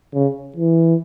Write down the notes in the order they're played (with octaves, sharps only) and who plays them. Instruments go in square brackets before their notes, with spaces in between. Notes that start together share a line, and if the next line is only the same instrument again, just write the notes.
[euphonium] C#3
E3